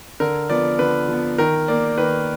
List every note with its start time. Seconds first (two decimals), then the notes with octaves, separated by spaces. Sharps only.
0.20 D3 A#4
0.50 F3 B3 D5
0.79 D3 B4
1.08 F3 B3
1.38 D#3 A#4
1.68 A#3 D5
1.98 D#3 B4